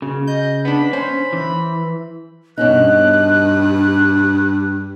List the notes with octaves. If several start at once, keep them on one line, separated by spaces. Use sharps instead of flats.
C#3 F#4
D#5 G6
B3 D4 B5
C#4 C5
E3
G2 B2 C#4 D#4 F#6